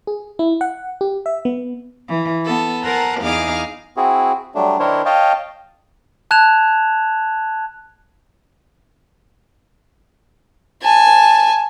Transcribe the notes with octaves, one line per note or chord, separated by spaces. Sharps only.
G#4
E4
F#5
G4
E5
B3
E3
B3 A4
A4 A#4 C5 F#5 G#5 A#5
E2 D#4 G#4 F5 D6 F6
C4 E4 F#4 G#4
F#3 G3 A3 D4
D#3 D4 E4 A#4 C5 C#5
C#5 D#5 F5 G5 A5
A5 F#6 G#6 E7 F7
G#5 A5